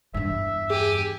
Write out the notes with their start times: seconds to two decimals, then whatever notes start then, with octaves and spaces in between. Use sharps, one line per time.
0.14 E2 G2 E5
0.70 G4 G#4 G#5